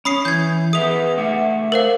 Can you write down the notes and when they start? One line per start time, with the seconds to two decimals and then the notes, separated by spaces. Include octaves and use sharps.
0.05 C#4 B5 D#6 C7
0.25 E3 G6 G#6
0.73 G#4 B4 E5 D#6 F7
1.18 A3 E5 F#5
1.72 A#4 C5 F5